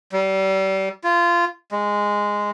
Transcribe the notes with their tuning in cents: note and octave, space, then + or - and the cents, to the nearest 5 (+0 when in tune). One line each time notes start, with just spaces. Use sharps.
G3 -35
F4 -20
G#3 -10